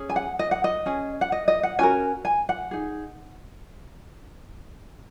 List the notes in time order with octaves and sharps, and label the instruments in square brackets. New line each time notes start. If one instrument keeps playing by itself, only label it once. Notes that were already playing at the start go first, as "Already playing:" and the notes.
Already playing: [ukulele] C#4 G#4
G#5
F#5
D#5
F#5
D#5
C#4 G#4
F#5
D#5
D#5
F#5
C#4 F#4 A#4 G#5
G#5
F#5
D#4 G#4